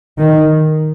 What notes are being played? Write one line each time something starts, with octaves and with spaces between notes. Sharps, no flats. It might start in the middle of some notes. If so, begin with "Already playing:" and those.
D#3